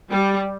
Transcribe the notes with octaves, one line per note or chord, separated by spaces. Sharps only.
G3